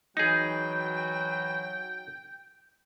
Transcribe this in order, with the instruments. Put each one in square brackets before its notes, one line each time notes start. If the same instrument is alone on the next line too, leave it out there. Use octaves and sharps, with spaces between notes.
[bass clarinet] E3 [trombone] F#3 [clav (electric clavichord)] D#4 G#4 [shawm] G5